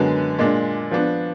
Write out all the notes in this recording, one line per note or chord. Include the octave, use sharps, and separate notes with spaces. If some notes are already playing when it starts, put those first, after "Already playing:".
Already playing: F#2 D3 G#3 B3
A#2 G#3 D4
F3 B3 D4